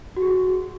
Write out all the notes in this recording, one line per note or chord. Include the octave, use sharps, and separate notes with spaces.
F#4
G#4
F#4